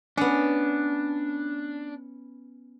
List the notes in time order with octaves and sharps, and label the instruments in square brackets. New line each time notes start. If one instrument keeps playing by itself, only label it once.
[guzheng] B3 C#4 [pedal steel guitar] D4